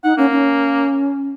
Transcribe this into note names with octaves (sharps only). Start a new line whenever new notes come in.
D#4 F#5
A#3 C#4
C#4